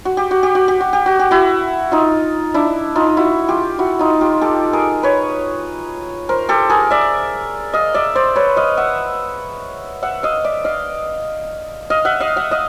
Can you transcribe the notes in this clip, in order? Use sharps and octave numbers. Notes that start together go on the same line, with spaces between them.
F#4
G4
F#4
G4
F#4
G4
F#4
G4
F#4
G4
E4 F#4
D#4 F4
D4 E4
D#4 F4
E4 F#4
F4 G4
E4 F#4
D#4 F4
F4 G4
G4 A4
G#4 A#4
B4 C#5
A#4 C5
G4 A4
G#4 A#4
D5 E5
D#5 F5
D5 E5
C5 D5
B4 C#5
D#5 F5
E5 F#5
E5 F#5
D#5 F5
D5 E5
D#5 F5
D#5 F5
E5 F#5
D#5 F5
E5 F#5
D#5 F5